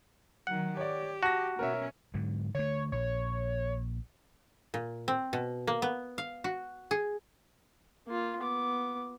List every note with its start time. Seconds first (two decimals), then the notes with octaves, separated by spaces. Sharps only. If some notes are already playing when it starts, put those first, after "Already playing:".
0.47 D#3 F#3 F#5
0.77 G4 C#5 D5
1.23 F#4 A5 A#6
1.59 B2 C#4 A#4 C#5 E5
2.14 G#2 D3 F#3
2.55 D3 A3 C#5
2.92 A#1 C#5
4.74 A#2
5.08 C4
5.33 B2
5.67 A#3
5.82 B3
6.18 F5
6.44 F#4
6.91 G#4
8.07 A#3 F4
8.40 B3 D6